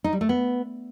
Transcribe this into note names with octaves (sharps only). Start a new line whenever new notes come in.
D#4
G3
A3
B3